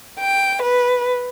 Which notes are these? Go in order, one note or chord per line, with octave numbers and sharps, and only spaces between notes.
G5
B4